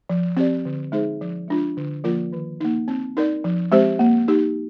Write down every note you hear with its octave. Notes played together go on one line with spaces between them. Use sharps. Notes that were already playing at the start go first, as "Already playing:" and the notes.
F3
C4 G4 D5
D3
G#3 D#4 G#4 C5
F3
G#3 D4 F4
D3
F3 A#3 F4 A#4
D#3
A#3 D#4
C4
D#4 A#4 D5
F3
G#3 C4 G4 C5
A#3
D#4 G4